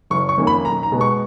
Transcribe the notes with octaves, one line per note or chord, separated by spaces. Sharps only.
F#1 C#6
C#6
F2 D#3 A#3 C#4
B5
B1 A#5
A#5
B2 G#3 B3
C#6